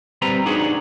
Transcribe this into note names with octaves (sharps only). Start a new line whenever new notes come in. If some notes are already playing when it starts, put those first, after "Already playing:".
G3 C4 B4 A#5
D4 D#4 F#4 G#4